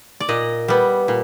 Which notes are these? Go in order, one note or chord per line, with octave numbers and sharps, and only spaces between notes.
D5
A#2 D#5
G3 B3
A#2